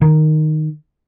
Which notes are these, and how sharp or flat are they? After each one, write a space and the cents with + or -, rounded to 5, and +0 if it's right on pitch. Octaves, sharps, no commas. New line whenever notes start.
D#3 -10